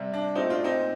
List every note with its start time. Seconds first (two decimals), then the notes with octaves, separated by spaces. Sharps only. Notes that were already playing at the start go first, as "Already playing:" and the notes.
Already playing: C3 G3
0.14 D4
0.35 A#2 F3 A3 C4 D#4
0.50 D4 F4
0.64 C4 D#4
0.79 A#2